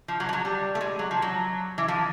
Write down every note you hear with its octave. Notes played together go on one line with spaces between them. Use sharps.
F3
F#3
F3
F#3
G3
A3
G#3
F#3
F3
F#3
E3
F3